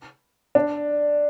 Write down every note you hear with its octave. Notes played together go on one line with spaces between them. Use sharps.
D4